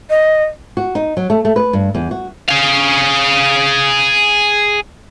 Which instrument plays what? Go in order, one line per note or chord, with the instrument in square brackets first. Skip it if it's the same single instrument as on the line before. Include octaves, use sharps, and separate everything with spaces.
[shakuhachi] D#5
[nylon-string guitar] F#4
D#4
F#3
A3
A3
B4
G2
E2
F#4
[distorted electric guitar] G#4 F5